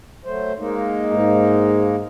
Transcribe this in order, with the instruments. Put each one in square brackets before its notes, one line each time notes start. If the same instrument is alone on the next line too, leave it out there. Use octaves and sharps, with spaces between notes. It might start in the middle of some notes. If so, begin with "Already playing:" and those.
[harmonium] F#3 A3 C5
G#3 A#3 D#4
[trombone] G#2